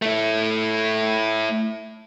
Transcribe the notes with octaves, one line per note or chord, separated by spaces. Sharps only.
A3 E4